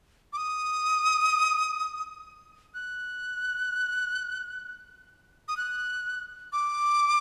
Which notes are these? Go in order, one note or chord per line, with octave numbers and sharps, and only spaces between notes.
D6
D#6
F#6
D#6
F#6
D6